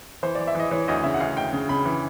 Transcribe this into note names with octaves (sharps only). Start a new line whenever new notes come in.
E3 C5
D5
E3
E5
E3 D#5
E3 C#5
D2 D#5
C#3 E5
F#5
D2 F5
D2 G5
C#3
C#3 B5
E3